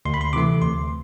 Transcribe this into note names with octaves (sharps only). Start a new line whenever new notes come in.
D2 C6
B5
C6
C3 E3 A3 D6
D2 C6